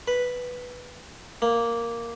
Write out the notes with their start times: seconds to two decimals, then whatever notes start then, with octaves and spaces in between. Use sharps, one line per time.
0.08 B4
1.42 A#3